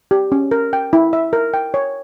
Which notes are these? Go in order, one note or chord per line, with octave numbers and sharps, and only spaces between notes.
G4
C#4
A#4
G5
E4
E5
A#4
G5
C#5